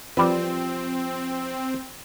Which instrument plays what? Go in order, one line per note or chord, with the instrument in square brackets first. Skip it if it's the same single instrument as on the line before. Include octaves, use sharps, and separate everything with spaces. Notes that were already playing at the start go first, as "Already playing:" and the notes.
[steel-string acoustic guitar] F3 [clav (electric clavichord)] G3 B4 [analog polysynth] C4